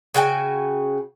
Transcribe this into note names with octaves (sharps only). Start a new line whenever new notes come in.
C#3 F#4 G5 G#5